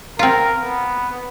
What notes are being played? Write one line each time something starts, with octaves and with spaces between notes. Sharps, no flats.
C4 F4 A#4
B3